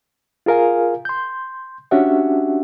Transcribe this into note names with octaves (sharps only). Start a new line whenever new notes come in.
F4 G#4 A#4 F5 G#5
C6 G6
C#4 D4 F#4 G4 E5 F#5